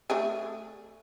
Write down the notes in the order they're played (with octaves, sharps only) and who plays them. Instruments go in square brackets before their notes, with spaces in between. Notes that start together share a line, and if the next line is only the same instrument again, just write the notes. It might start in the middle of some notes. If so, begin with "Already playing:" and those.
[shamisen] A3 D4 G#4